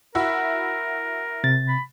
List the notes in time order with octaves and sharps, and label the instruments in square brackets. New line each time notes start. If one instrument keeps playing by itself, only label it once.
[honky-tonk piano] E4 F#4 E5 [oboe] A#4
[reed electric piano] C3 A6
[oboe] B5